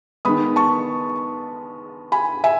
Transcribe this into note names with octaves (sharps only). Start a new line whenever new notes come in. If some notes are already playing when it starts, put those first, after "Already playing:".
D#3 G#3 B3 B5 D#6
A5 C#6
G#5 B5
E5 G#5